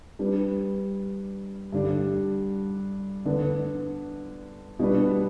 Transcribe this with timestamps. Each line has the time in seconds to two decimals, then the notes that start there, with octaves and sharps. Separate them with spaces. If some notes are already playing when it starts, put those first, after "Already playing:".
0.19 G3 D4 B4
1.72 G2 D3 G3 D4
3.26 D3 B3 D4 B4
4.79 B2 G3 D4 B4